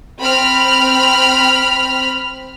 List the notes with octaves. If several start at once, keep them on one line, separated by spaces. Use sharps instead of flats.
C4 B5 F6